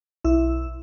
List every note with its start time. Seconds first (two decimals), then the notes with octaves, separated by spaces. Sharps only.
0.24 B1 E4 E5 E6